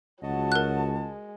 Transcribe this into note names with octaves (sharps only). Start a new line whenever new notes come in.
C#2 F#3 F#4 D#5 A5
A#4 F#6
G#3